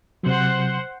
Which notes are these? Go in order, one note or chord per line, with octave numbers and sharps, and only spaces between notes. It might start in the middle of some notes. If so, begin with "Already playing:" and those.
C3 F#3 C5 F#5